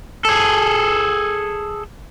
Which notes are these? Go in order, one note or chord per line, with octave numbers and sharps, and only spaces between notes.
G#4 A4